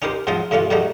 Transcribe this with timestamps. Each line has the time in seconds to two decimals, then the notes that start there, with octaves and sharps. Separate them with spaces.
0.02 C#4 D#4 G4 A#4 C5
0.27 G#2 F3 F#3 F4 D#5
0.51 G2 D3 A3 C#4 F4
0.70 G#2 D#3 F#3 G3 A3 D#4